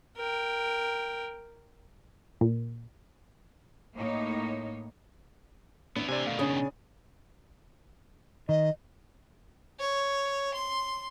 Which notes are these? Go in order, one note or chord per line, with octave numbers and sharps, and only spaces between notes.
A#4 G5
A#2
A2 A#3 D#4 C#5
B3 D4 E4
A2 C3 C4 D5 G#5
B2 D#3 A3 D5 F5
C#3 C#4 D4 D#6
G#5
D#3 D#5
C#5
C6